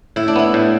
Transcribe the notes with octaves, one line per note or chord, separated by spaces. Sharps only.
A2 E4
D4
B3 E4
A2